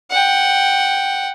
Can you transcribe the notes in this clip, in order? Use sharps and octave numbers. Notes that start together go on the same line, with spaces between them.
F#5 G5